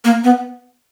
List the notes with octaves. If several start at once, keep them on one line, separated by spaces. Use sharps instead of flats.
A#3
B3